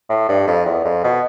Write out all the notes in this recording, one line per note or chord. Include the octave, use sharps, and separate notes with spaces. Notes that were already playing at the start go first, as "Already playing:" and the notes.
A2
G2
F2
E2
F2
B2